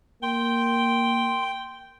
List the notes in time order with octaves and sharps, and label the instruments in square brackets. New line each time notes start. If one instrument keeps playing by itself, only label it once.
[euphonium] A#3 [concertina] G5 [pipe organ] C6